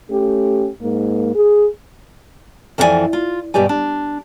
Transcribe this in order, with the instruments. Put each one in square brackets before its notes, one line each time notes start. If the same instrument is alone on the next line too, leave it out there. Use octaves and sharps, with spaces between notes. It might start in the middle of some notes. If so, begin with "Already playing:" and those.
[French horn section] A3 C#4 G4
G#2 A#3
G#4
[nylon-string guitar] F2 E3 D4 E4 D5 G#5
F4
G2 B2 G4 D5 G#5
D4